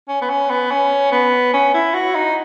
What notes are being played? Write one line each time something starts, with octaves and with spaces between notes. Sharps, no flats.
C#4
B3
C#4
B3
C#4
B3
C#4
E4
F#4
D#4